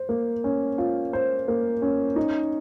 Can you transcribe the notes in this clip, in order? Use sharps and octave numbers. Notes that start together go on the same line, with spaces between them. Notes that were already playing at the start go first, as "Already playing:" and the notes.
Already playing: C5
A#3
C#4
F4
C5
A#3
C#4
D#4